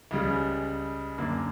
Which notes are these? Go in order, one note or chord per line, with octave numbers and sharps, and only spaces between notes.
C#2 C#3 G3
F#2 D3 A#3 D4